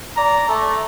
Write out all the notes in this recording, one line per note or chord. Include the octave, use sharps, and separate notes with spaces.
D5 A#5
A3